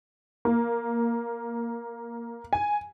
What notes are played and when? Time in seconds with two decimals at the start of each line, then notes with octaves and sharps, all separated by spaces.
0.45 A#3
2.53 G#5